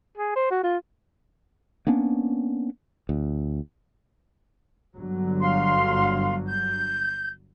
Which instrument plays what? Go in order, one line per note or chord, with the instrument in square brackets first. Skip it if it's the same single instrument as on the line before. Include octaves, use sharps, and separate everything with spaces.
[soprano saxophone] G#4
C5
F#4
F4
[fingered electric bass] A#3 B3 C#4 D4
D2
[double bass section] G1 D3 F#3
[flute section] F5 C6
G6